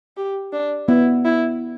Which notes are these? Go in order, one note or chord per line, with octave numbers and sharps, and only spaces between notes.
G4
D4
B3 E4
E4